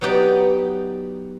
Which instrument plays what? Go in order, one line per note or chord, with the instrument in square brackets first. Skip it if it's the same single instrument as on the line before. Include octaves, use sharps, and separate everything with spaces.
[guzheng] F#3 B3 D#4 G4 D5